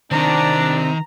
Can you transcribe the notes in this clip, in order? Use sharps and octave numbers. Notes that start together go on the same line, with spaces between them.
C3 D#3 C4 D4 A#5